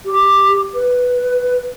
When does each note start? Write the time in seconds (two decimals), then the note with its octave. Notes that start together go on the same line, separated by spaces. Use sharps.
0.05 G4
0.74 B4